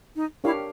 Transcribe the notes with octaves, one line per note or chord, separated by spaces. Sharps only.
D#4
D4 E4 G4 A#4 C#5 F5